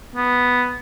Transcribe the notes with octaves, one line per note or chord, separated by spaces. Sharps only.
B3